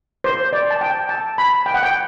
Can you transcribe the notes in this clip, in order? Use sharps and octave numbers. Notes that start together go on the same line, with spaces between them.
C5
D5
A5
G5
A5
B5
G5
F#5
G5